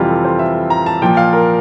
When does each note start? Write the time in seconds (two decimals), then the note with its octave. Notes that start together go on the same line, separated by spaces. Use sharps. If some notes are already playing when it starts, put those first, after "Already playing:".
Already playing: F2 C3 E3 G3 F4 G4
0.08 A4
0.24 C5
0.39 E5
0.70 A#5
0.86 A5
1.02 A#2 F3 G5
1.17 F5
1.33 A#4